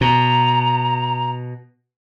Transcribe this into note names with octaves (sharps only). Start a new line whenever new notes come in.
B2 A#5